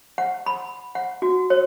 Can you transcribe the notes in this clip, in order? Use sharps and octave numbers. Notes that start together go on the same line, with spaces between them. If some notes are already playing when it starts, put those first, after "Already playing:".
F#5
B5
F#5
F#4
C#5